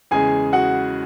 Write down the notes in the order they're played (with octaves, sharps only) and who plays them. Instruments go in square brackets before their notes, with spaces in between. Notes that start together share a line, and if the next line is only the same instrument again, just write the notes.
[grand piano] E2 C#3 G#3 G#4 G#5
F#4 F#5